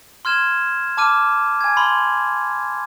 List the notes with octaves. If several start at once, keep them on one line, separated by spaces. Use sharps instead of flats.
C6 F6 G#6 E7
A5 D6 F6 D#7
G#5 G#6
B5 C6